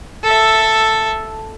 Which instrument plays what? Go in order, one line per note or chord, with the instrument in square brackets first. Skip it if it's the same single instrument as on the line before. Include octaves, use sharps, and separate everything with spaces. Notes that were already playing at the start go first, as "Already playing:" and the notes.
[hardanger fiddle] A4 E5